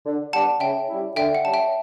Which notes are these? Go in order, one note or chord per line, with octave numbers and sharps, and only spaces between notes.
D3
G3 B3 D4 F#5 A5
C#3 E5 G5
G3 C#4 E4
D3 E5 G5
F#5
G3 C#4 A5
E5 G5